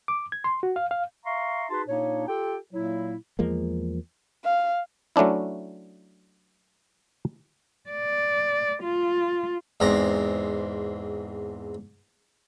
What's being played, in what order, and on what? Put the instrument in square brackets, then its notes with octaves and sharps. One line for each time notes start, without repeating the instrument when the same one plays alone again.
[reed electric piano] D6
G#6
C6
F#4
F5
F5
[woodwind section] E5 F5 A#5 C6 C#6
D#4 F#4 G#4 B4 A5 C6
A#2 A#3 D4 D#4 C#5
F4 G4 A4 G5
A#2 F#3 A#3 E4
[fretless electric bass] E2 F3 G#3 A#3
[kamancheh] F5
[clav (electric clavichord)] F#3 A3 C#4 D4 E4
[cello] D5
F4
[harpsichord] E2 G#2 C4 A#5